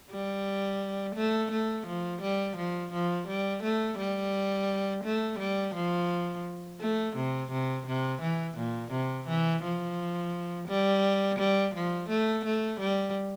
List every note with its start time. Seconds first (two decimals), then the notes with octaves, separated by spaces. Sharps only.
0.11 G3
1.15 A3
1.51 A3
1.87 F3
2.22 G3
2.57 F3
2.92 F3
3.27 G3
3.63 A3
3.98 G3
5.04 A3
5.39 G3
5.75 F3
6.81 A3
7.16 C3
7.51 C3
7.86 C3
8.21 E3
8.57 A#2
8.92 C3
9.28 E3
9.63 F3
10.68 G3
11.39 G3
11.75 F3
12.09 A3
12.45 A3
12.80 G3